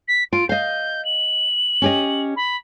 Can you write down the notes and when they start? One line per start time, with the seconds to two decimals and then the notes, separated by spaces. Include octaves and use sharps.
0.08 B6
0.33 F4 D7
0.49 D#5 F5 G6
1.05 F#7
1.82 C#4 G4 D#5
2.36 B5